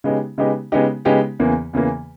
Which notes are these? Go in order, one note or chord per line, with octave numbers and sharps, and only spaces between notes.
C#3 G#3 B3 D#4 G4
C#3 G#3 B3 D#4 G4
C#3 G#3 B3 D#4 G4
C#3 G#3 B3 D#4 G4
E2 C#3 E3 A#3
E2 C#3 E3 A#3